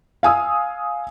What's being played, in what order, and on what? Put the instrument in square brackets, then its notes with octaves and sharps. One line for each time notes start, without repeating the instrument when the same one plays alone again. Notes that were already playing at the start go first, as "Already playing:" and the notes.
[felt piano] F5 G#5 D#6 E6